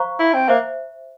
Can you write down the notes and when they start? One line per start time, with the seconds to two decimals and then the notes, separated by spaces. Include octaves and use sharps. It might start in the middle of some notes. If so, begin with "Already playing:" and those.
Already playing: C5 F5 A#5 C#6
0.19 E4
0.34 C4
0.48 A#3 C5 E5